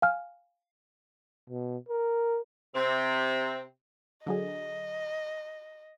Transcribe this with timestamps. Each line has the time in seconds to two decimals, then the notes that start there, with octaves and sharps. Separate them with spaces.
0.02 F5 G#5 F6
1.50 B2
1.89 A#4
2.75 C3 C4
4.26 D3 F#3 G#4 D#5